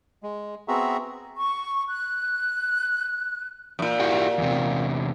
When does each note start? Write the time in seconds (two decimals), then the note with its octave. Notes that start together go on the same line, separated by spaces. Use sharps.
0.23 G#3
0.68 B3 C4 F#4 G#4 E5 A#5
1.37 C#6
1.88 F#6
3.79 F#2 A#2
4.00 E4 F#4 G4
4.38 E2 C3